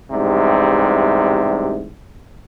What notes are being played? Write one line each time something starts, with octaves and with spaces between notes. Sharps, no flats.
A1 G#2 C3 G3